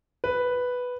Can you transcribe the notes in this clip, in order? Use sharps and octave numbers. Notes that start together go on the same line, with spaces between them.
B4